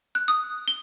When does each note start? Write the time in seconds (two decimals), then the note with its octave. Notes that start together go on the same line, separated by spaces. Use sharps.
0.15 F#6
0.28 D#6
0.68 G7